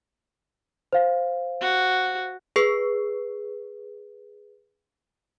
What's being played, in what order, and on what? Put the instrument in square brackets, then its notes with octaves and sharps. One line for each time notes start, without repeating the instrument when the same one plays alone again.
[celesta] C5 F5
[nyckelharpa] F#4
[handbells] G#4 B4 C7